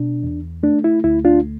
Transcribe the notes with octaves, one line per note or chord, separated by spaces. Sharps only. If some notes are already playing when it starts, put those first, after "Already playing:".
Already playing: B2 D4
E2
A3 D4
E4
D2 E4
D4 F4